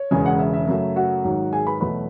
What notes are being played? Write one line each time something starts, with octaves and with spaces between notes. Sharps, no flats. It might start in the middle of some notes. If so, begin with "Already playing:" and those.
Already playing: C#5
E1 E2 C#3 G#3 G#5
F#5
E5
E5
F#2 C#3 F#3 A3
F#4 F#5
G#1 G#2 F#3
G#4 G#5
B4 B5
E2 B2 F#3 A3 B4 B5